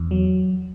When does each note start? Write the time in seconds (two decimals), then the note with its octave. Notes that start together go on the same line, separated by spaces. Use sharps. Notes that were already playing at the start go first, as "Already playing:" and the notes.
Already playing: E2
0.11 F#3